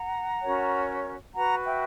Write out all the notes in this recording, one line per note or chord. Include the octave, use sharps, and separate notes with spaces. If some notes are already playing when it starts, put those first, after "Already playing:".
Already playing: F#5 A#5
C#4 F#4 A#4 C#5
F#4 B4 F#5 A#5
E5 G5